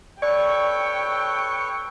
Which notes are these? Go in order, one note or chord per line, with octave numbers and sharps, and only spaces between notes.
A4 B4 C#5 D5 G5 C#6